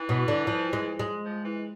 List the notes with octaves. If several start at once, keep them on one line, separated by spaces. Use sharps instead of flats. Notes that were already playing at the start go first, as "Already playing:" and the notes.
Already playing: E3
B2
D3
F3
G#3
G#3
F3
E3